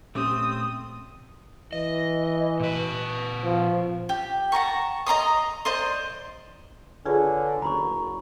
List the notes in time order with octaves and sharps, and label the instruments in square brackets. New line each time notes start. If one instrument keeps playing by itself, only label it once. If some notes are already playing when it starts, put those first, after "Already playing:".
[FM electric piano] A#2 C#4 G4 [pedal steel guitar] A3 C4 C5 [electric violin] D#6
[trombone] E3 [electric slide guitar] D#5
[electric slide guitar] A#2 B4
[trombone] F3
[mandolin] G4
F#5 A5 A#5 C#6
D#5 A#5 C6 D#6
C5 D5 D#5 C6
[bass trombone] D3 [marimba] F4 G#4 A5 [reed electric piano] B4 C#5 G#5
[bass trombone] F#1 [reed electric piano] D2 [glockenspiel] A#5 B5 C#6